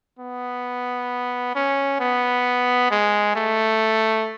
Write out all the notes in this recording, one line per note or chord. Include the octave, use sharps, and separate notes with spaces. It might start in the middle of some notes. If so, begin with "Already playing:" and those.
B3
C#4
B3
G#3
A3